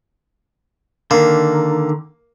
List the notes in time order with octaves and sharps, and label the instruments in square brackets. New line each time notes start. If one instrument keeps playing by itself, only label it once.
[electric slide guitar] D3 D#3 [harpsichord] A#3